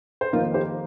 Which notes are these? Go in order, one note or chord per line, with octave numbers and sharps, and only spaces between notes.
C5
F2 D#3 A#3 D#4 F4 A#4
G4 C5